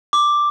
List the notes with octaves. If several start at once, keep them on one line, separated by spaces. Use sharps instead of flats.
D6